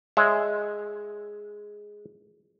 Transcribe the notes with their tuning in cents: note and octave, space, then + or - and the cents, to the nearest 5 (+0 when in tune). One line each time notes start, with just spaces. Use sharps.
G#3 +0 C#5 +15 E5 +0